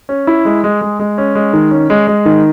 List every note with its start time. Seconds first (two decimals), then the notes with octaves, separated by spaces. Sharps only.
0.09 C#4
0.27 E4
0.45 G#3
0.64 G#3
0.81 G#3
0.99 G#3
1.18 C#4
1.35 G#3
1.53 D#3
1.71 C#4
1.90 G#3
2.08 G#3
2.25 D#3